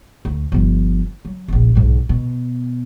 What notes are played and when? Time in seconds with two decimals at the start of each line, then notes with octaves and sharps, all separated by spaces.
0.25 D2
0.52 G1 F3
1.25 F#3
1.48 F1 A#1
1.75 B1 G#2
2.09 B2